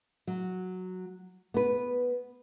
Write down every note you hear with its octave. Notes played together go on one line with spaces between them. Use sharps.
F#3
B3 B4